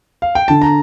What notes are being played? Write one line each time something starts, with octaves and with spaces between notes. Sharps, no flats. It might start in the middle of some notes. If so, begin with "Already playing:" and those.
F5
G5
D3 A5
A#5